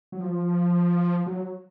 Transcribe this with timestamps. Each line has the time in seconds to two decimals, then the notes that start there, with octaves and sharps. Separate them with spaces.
0.12 F#3
0.20 F3
1.26 F#3